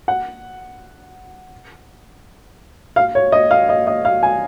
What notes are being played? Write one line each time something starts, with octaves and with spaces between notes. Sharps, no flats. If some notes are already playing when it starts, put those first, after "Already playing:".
F#5
F5
C#5
D#5
F5
D#5
D#5
F5
G#5